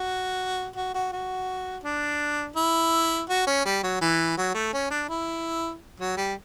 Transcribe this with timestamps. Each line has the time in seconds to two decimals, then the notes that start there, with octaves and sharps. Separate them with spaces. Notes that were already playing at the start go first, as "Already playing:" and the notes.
Already playing: F#4
0.76 F#4
0.94 F#4
1.12 F#4
1.84 D4
2.56 E4
3.29 F#4
3.47 C#4
3.65 G3
3.83 F#3
4.01 E3
4.38 F#3
4.55 A3
4.73 C#4
4.90 D4
5.09 E4
6.00 F#3
6.17 G3